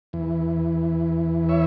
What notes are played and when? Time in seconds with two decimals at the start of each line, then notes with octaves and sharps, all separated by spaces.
0.13 E2 E3
1.49 C#5 E5